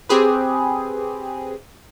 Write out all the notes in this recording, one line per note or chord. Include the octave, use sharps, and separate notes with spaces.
C4 G4 G#4 B4